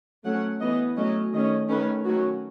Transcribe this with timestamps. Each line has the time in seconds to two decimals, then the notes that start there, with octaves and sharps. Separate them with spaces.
0.24 F#3 A3 C#4 F#5
0.61 E3 B3 D#5
0.96 F#3 A3 C#4 D#5
1.33 D#3 A3 C#4 D#5
1.69 D#3 A3 C#4 B4
2.05 D#3 F#3 A3 C#4 F#4